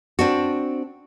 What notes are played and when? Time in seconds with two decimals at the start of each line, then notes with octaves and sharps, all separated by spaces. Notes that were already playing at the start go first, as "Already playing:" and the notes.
0.19 C4 D4 F#4